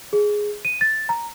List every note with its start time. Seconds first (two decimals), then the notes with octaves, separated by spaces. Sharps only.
0.13 G#4
0.65 D#7
0.81 A6
1.09 A#5